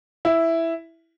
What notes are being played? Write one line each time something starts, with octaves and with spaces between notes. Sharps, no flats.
E4